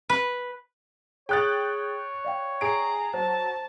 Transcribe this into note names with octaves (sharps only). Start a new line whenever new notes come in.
B4
G#4 C#5 G5 D#6 F#6 A6
D5 F5 G5
G#4 A#5 D7
F#3 C5 A5